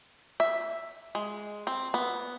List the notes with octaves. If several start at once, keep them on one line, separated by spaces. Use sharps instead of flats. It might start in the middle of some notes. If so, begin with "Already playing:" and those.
E5
G#3
C4
B3